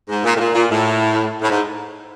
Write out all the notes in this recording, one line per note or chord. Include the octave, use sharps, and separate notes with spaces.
G#2
A#2
A2
A#2
A#2
A2
A2
G#2